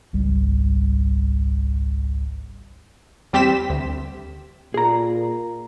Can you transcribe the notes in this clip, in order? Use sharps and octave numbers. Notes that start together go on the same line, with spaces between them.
G#1 C#2 G3
E2 G3 C4 G4 B6 E7
D2
A#2 G#4 A#5